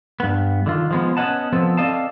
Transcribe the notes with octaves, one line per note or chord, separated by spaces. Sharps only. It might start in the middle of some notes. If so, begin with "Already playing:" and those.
G2 B3
D3 D#3 F4
F3 G#3 B3
B3 C#4 D5 D#5 F#5 A5
F3 B3 C4 A4
C4 A4 D5 D#5 F5 A5